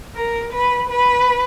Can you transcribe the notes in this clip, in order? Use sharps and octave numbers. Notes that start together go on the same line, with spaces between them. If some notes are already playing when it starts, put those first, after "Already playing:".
A#4
B4
B4